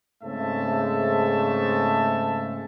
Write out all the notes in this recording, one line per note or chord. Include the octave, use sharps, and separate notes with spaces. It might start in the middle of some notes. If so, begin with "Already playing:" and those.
G#2 C#3 A3 C4 E5 A5